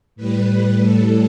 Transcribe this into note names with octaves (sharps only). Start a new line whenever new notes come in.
A2 G3 B4
A2 G3 A4